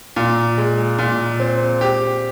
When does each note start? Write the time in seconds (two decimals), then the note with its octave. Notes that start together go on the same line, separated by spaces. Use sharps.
0.16 A#2
0.58 G#3
0.99 A#2
1.40 C4
1.81 G4